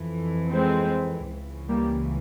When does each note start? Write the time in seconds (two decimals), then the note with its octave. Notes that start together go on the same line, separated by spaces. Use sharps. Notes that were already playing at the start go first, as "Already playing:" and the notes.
Already playing: F2 E3
0.51 G#3 C4
1.29 C#2 C#3 E3
1.68 G3 A#3